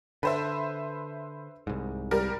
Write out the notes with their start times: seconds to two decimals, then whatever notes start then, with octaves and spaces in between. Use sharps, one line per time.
0.23 D3 B4 C5 E5
1.67 C2 G#2
2.11 G3 A#4